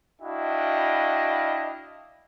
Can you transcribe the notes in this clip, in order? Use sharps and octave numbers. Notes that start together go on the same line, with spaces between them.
D4 E4 F#4 D#5 F5 G5